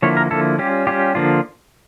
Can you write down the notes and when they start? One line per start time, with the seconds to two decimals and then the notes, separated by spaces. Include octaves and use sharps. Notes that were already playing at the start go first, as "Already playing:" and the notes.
0.02 D3 F3 A#3 E4 C#5
0.17 A#4
0.30 D3 F3 A#3 E4 A4
0.58 G3 C#4 F4 G4
0.87 G3 C#4 F4 G4
1.15 D3 F3 A#3 D4 F4